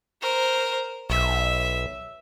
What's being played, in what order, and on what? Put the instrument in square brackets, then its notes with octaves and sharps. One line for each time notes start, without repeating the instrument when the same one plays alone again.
[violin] A#4 C5
[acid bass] B1 [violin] E5